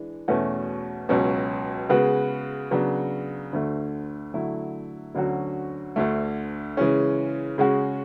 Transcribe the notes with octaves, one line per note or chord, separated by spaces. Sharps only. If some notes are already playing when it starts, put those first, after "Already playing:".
Already playing: E3 G#3 D4
E2 B2 A3 C#4 F#4
C#2 B2 F#3 C#4
C#3 G#3 B3 F#4 B4
C#3 F#3 B3 D4 F#4
D2 D3 A3
D3 F#3 A3 E4
D2 D3 F#3 C#4 F#4
D2 D3 A3
C#3 E3 G#3 C#4
C#3 G#3 C#4 F#4